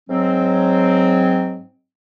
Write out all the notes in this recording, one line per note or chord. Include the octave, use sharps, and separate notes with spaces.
G#2 F#3 C4